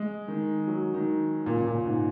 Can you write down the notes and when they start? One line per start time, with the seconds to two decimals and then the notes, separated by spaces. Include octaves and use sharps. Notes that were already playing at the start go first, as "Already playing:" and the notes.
Already playing: G#3
0.28 D#3
0.67 F#3
0.94 D#3
1.46 A#2
1.57 C#3
1.67 A#2
1.85 G#2